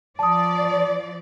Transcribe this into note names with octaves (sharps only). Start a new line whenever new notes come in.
F3 D5 A5 D#6